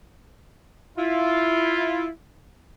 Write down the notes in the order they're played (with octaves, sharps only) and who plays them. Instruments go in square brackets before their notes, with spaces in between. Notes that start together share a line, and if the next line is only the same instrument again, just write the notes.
[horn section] E4 F4